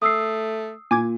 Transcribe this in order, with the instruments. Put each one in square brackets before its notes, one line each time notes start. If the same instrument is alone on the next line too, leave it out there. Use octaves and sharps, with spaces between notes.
[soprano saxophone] A3 [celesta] D#6 E6 C7
[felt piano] A#2 [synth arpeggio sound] G#5 D6 G#6